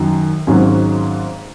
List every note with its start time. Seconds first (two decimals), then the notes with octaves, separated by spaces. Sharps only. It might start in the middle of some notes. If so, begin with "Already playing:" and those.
Already playing: F#2 D#3 F#3
0.47 G#1 G#2 F#3 C#4